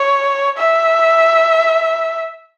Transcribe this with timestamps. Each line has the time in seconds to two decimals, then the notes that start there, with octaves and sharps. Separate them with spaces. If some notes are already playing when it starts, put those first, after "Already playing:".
Already playing: C#5
0.58 E5